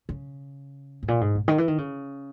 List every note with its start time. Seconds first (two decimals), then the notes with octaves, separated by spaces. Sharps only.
0.09 C#3
1.03 G#2
1.08 A#2
1.21 G#2
1.35 A#2
1.48 D#3
1.58 E3
1.68 D#3
1.78 C#3